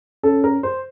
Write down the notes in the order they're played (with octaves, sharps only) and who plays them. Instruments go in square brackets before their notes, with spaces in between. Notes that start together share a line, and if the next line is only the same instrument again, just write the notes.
[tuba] C#4 [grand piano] A4
[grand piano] A#4
C5